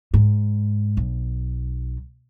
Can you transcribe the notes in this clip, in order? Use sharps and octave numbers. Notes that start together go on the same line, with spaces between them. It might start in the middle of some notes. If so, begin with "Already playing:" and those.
G#2
B1